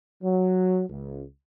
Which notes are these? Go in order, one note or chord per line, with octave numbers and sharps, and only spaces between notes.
F#3
C#2